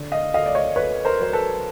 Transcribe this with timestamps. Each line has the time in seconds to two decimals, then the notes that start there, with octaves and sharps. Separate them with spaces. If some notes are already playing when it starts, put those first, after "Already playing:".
Already playing: D3
0.12 D#5 F5
0.33 D2 D#5 F5
0.46 D5
0.55 C#5 D#5
0.76 D2 B4 C#5
1.05 A#4 C5
1.19 F#3 C5
1.33 A4 B4